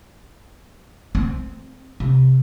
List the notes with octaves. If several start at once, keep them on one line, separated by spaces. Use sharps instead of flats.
C4
C3